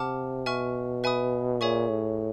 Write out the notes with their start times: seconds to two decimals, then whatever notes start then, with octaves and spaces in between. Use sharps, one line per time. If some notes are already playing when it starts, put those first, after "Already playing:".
Already playing: C3 F#5 A5 D6 F6
0.46 B2 E5 G#5 C#6 F6
1.04 B4 E5 G#5 B5 D#6
1.60 A#2 G#4 C#5 E5 G#5 C#6
1.89 A2